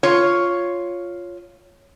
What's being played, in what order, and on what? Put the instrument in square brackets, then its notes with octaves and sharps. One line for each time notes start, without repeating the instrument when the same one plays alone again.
[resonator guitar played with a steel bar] F4 C#5